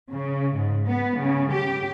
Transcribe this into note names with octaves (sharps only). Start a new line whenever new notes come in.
C#3
G#2
B3
C#3
G4